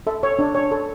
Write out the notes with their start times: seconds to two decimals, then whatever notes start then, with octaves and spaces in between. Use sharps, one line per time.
0.07 A4 E5
0.23 C#5
0.39 D4
0.55 C#5
0.71 A4